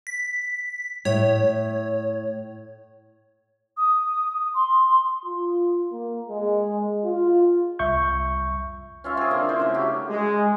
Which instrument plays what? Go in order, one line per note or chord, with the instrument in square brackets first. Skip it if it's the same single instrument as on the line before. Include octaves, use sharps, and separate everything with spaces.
[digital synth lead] B6
[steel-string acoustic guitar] A2 [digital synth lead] C#5
[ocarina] D#6
C6
[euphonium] F4
A#3
G#3
F4
[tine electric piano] C2 E5 C#6 G6
[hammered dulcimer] C#4 F4 E5
C4 G#4
D3 A#3
E4 C5
C#3 A3
F#4 G4
[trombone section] G#3